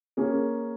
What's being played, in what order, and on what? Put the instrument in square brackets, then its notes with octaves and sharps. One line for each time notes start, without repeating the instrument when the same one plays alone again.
[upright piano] A#3 C#4 G#4